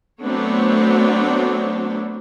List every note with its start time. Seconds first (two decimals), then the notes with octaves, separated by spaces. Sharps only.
0.21 F#3 A3 B3 C4 D4 C#5